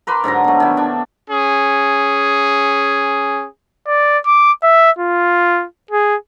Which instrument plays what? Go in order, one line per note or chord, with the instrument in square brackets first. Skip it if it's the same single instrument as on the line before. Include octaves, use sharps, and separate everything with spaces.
[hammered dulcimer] A#4 B4 C6 D6
G#2 D3 F#3 A#5
B2 A3
D#3 E4
D4
[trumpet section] C#4 G#4
[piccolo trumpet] D5
D6
E5
F4
G#4